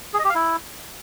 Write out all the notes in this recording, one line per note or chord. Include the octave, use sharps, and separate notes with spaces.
G#4
D#5
G4
F5
E4